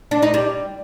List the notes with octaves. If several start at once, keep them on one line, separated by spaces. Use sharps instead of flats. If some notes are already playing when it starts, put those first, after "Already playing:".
D4
D#4
G3